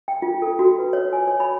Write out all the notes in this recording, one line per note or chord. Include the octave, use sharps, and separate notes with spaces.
G5
F4
A4
F#4
B4
C#5
G#5
C#5
B5